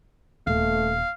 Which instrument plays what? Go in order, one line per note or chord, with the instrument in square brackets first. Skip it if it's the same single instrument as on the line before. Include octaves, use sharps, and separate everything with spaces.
[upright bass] D#1 [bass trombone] A3 [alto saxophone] F5